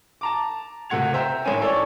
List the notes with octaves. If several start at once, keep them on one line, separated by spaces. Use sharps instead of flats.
A5 A#5 D6
C#2 C3 A3 F#5 G#6 F7
C5 E5 G5 A#5
A1 G#2 C4 C#4 G#5
A4 C#5 D5 C#6